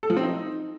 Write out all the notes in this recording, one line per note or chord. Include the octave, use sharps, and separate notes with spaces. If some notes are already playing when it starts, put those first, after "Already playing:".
A4
F3
C4
D#4